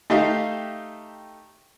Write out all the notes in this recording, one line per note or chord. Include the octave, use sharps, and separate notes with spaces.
A3 D#4 G4 E5 F5 G5